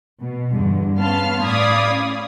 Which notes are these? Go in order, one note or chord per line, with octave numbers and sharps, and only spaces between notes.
B2
E2 G2 D3
B3 C#4 F5 A5 C6 F6
A2 D5 F5 B5 D#6 G#6
C#4